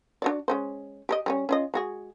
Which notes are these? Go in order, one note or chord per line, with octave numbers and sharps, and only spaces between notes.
D4 F#4 D5
G#3 C#4 C5
G4 A#4 D#5
G3 A3 C#4
C#4 F4 D#5
G#3 F#4 G#4